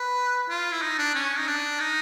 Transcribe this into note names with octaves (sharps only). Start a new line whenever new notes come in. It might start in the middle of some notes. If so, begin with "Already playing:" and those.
Already playing: B4
F4
E4
D#4
D4
C#4
D#4
D4
D#4